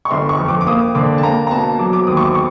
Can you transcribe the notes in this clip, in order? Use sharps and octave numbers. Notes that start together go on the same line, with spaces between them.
C#6
G1 C6
C#6
F2
D6
D6
A#3 D#6
D3 D6
A5
A#3 A#5
A#5
B2 A5
F#3 D6
D6
D#2 D#6
C#6
D6
C#6